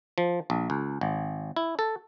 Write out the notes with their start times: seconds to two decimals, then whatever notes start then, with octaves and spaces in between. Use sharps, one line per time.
0.18 F3
0.50 A#1
0.70 C#2
1.01 G#1
1.56 E4
1.79 A4